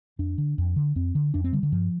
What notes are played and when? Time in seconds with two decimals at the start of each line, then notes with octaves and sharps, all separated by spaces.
0.19 F2 D4
0.38 D3
0.58 F2
0.76 D3
0.95 F2 C4
1.15 D3
1.34 F2 D4
1.44 C4
1.53 D3 G3
1.63 D3
1.72 G2 F3